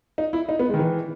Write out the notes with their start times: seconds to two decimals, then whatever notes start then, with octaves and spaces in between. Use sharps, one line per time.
0.18 D#4
0.33 E4
0.49 D#4
0.59 B3
0.69 G#3
0.74 D#3
0.79 E3